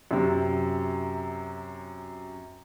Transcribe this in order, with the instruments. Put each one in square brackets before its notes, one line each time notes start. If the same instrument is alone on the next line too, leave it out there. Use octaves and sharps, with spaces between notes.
[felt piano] F#2 C3